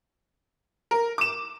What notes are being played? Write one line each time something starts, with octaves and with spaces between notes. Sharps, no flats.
A#4
D6 E7